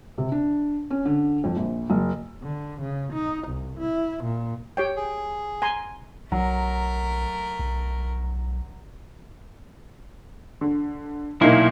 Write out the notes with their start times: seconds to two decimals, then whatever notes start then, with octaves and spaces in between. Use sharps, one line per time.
0.18 C3
0.32 D4
0.90 C#4
1.05 D3
1.44 F2
1.56 A#1
1.90 F#1
2.43 D3
2.81 C#3
3.13 D#4
3.48 C2
3.78 E4
4.24 A#2
4.77 G4 C#5 G5
4.96 G#4
5.62 G#5 A#5 C6
6.32 B1 F#3 A3 A#4
7.59 B1
10.61 D3
11.41 B1 A#2 A#3 D#4 E4